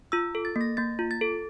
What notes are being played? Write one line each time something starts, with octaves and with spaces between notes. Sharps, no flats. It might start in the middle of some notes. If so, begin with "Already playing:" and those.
F4 E6
A4
A6
A#3
A#6
A#3 A6
F4
A6
A4